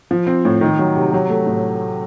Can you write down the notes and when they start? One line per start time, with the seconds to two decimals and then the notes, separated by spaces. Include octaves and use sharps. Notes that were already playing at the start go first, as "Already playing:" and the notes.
0.11 F3
0.27 C4
0.45 A2
0.61 D#3
0.79 F#3
0.96 C3
1.13 F#3
1.30 A3
1.47 A2